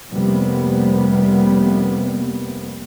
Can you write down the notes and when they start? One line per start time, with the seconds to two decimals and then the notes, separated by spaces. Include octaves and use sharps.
0.13 F1 C3 G3 A#3 B3